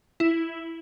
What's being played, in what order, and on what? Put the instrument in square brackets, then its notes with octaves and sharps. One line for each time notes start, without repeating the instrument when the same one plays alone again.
[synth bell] E4